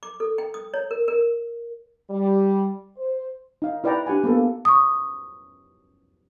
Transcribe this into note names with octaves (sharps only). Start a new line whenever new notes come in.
D6
A4
G5
D#6
C#5
A#4
A#4
G3
C5
D#4 F5
E4 B4 D5 F#5 G5 A#5
D4 G4 F#5 G#5
A#3 B3 A4
C#6 D#6